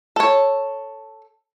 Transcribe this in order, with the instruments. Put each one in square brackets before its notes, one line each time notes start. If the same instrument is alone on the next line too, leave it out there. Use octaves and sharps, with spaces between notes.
[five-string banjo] A4 C#5